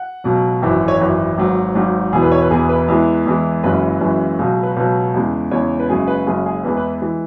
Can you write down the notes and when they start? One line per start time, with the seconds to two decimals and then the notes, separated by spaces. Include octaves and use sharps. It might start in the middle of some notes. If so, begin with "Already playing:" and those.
Already playing: F#5
0.24 C#2 B2 F#3
0.62 G#1 F#2 E3
0.88 C#5
1.00 G#1 F#2 E3 B4
1.38 G#1 G#2 F#3
1.75 G#1 G#2 F#3
2.12 E1 E2 E3 G#4
2.22 B4
2.32 C#5
2.41 B4
2.50 E1 E2 E3 G#4
2.69 B4
2.88 E2 E3 G#3
3.26 E2 E3 G#3
3.63 F#1 F#2 C#3 E3 G#3 B4
4.01 F#1 F#2 C#3 E3 G#3
4.39 C#2 B2 F#3 G#4
4.63 B4
4.77 C#2 B2 F#3 B4
5.14 E2 C#3 G#3
5.51 E2 C#3 G#3 C#5
5.80 B4
5.89 F#1 F#2 C#3 G#3 G#4
6.07 B4
6.26 F#1 F#2 C#3 G#3 G#4
6.46 G#4
6.64 E2 E3 G#3 B4
6.77 B4
7.02 E3 G#3